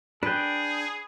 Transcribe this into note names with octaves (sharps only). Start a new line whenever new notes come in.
D4 G#4 B4 G5